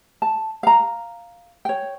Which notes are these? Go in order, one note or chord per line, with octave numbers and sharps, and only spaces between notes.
A5
F5 A#5
C#5 G5